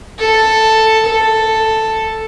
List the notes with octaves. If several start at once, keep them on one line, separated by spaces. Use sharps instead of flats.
A4
A4